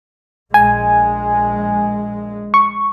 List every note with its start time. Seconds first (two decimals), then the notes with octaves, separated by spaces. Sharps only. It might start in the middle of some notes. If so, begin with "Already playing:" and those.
0.54 A#1 G#3 G#5
2.54 C#6